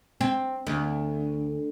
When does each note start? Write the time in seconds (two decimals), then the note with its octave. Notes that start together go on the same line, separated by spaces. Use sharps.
0.21 C4
0.67 D2